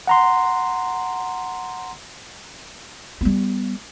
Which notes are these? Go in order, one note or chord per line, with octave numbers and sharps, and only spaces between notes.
F#5 A#5 C6
G3 B3